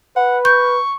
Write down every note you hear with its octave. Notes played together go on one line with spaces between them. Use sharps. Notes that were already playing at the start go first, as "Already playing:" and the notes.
B4 F#5
C#6 G6